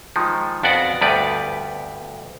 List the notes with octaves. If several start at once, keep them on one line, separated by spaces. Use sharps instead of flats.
D#3 F3 G#3
F2 B3 C#4 F#4 D5 F#5
D2 G2 G3 B3 B4 D5